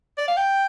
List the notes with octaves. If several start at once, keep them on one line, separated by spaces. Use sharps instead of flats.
D5
F5
G5